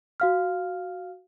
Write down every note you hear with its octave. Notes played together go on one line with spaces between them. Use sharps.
F#4 F5 F6